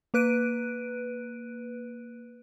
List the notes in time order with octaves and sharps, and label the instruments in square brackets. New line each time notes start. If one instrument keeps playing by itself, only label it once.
[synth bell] A#3 B4 F#6 D7 D#7